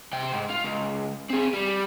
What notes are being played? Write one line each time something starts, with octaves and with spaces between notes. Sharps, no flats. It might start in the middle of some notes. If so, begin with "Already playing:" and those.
C3 G5
G#2
F4
C#2
C4 G#4
G3